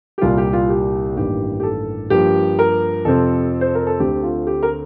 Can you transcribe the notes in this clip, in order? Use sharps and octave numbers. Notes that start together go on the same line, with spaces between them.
G4
C2 A#2 G3 A#3 F4
G4
F4
G4
A1 G2 D#3 A#3 G4
G4
A4
G2 F3 A#3 G4
A#4
F2 C3 F3 C4 A4
C5
A#4
A4
D2 D3 A3 C4 G4
F4
G4
A#4